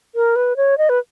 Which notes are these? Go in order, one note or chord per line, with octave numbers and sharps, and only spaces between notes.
A#4
B4
C#5
D#5
B4